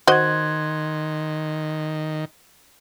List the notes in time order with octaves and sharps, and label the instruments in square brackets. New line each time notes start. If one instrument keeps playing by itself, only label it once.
[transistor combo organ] D#3 [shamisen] F#4 C5 D#5 [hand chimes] C6 F#6 G#6